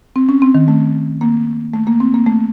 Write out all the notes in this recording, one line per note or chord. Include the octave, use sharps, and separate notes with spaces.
C4
C#4
C4
D#3
A3
A#3
A3
A#3
C4
A#3
A3